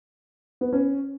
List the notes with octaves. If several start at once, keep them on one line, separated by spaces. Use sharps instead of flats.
B3
C#4